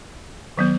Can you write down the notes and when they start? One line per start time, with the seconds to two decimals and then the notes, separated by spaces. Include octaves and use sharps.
0.57 D#3 F#3 B3